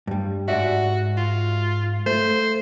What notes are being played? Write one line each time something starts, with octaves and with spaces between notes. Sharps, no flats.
G2 G3
G#2 F#4 D5 E5
F4
A3 C5